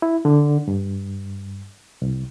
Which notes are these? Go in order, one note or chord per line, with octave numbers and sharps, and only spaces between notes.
E4
D3
G2
C2